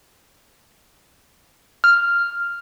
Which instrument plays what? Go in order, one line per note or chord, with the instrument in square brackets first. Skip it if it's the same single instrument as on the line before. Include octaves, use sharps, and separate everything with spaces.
[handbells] F6